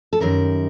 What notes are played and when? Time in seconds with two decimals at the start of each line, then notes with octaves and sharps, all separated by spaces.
0.13 A4
0.20 F#2 D#3 G3 A#4